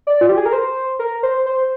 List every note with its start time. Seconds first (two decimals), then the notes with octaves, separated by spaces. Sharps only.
0.07 D5
0.21 F4
0.29 G4
0.37 G#4
0.46 A#4
0.53 C5
0.99 A#4
1.23 C5
1.46 C5